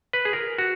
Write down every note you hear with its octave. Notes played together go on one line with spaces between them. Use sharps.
B4
G#4
A#4
F#4